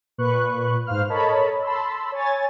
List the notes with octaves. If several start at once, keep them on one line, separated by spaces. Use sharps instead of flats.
A#2 B4 C#6 F#6
G#2 C5 F5 F6
A4 A#4 C#5 D#5 A5 B5
A5 B5 C6 E6
C#5 G#5 A6